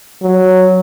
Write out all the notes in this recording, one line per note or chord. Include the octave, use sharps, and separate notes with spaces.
F#3